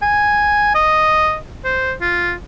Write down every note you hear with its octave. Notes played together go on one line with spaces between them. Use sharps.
G#5
D#5
C5
F4